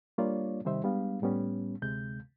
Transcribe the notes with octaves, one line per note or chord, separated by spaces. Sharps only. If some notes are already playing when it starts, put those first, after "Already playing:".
G3 A#3 D4 F4 C#5 D5
C3 D#3 G3 D#4 C5 E5
G3 G#3 B3 D4 F5
A2 G3 B3 C#4
D2 C3 G#3 G6